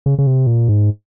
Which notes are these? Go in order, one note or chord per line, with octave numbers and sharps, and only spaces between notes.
C#3
C#3
C3
A#2
G#2